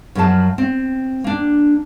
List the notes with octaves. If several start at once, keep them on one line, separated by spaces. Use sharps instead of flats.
F#2 F3 F#3 G#4 F5 A5
C4
A#3 D4